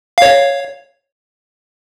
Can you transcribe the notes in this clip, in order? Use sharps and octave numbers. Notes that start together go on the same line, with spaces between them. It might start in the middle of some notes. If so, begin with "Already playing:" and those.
C#5 F5